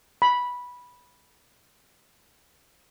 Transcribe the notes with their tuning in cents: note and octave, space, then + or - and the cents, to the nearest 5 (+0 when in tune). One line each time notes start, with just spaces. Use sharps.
B5 -10